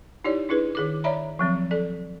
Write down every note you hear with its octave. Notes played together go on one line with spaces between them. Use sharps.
D#4 E4 G4 C#5 D5
D4 E4 G#4 B4
D#3 G#4 D6
C#5 D5 E5 A#5 B5
F3 F#3 C4
A4 D5